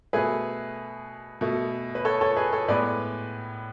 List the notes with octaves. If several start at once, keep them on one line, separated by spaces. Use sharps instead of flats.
B2 A3 G#4 B4
B2 A3
B4
A4 C#5
A4 C#5
G#4 B4
A4 C#5
A2 G#3 B3 B4 D5